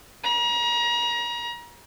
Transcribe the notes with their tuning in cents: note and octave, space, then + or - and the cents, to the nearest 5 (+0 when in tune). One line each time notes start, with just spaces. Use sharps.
A#5 +35